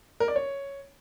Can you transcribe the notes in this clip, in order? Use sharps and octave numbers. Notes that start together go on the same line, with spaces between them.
A#4
D5
C#5